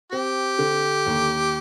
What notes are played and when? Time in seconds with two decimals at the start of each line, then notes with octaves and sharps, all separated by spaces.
0.12 C4 G4
0.59 D3
1.06 D#2